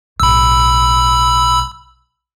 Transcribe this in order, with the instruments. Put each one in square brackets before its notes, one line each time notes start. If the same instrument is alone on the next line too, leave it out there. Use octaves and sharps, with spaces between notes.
[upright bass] B1 A2 [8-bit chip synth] B5 E6